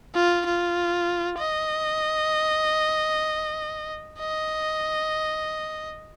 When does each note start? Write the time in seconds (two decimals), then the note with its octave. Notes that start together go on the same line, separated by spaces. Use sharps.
0.14 F4
0.45 F4
1.39 D#5
4.20 D#5